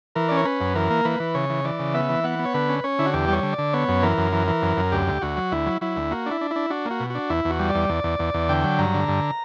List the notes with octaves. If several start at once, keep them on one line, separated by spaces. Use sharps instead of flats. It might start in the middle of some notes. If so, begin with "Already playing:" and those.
E3 A#4
C#4 D5
C#5
C#4 B4
F#2
E3 A#4
A#3
E3 B4
E3
C#3 C#5
E3
E3 D5
C#3
B3 E5
E3
B3 F#5
B3
C#5
D3 B4
C#4
C#4 C#5
D3 E4
F#4
E2 G4
G3 C#5
D3
D5
D3
B3 C#5
F#2
E3 A#4
F#2
E3
E3
F#2
F#2
D2 G4
D2
D2 F#4
F#3
D2 E4
F#3
F#3 E4
D2
A#3 F#4
D4 E4
D4
E4
D4
D4 F#4
A#3
F#4
B2
D4 F#4
E2 E4
E2
F#4
G3
D5
E2
E2
E2
E2
E2
D3 G5
F#3
G2 A#5
D3
G2